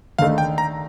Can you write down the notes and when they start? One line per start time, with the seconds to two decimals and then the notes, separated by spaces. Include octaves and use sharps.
0.19 D#2 D3 A3 D#4 F5
0.38 G5
0.58 A#5